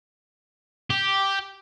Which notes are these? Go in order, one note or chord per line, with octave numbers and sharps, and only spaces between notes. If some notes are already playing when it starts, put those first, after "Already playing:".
G4